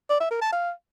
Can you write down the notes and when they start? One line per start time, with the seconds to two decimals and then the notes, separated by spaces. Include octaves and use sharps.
0.09 D5
0.20 E5
0.31 A#4
0.41 A5
0.52 F5